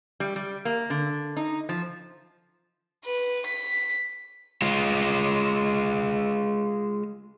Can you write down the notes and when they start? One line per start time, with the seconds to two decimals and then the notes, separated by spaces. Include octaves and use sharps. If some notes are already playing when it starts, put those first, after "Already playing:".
0.20 G3
0.36 G3
0.65 A#3
0.90 D3
1.37 D#4
1.69 F3
3.06 B4
3.47 B6
4.62 G#3 F4